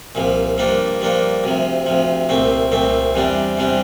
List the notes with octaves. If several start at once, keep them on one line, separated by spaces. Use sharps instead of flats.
C2 A#2 F3
G2 F3 A#3 D4
G2 F3 A#3 D4
D2 C3 F3
D2 C3 F3
C2 A#2 A3 C4
C2 A#2 A3 C4
E2 C3 G3 D4
E2 C3 G3 D4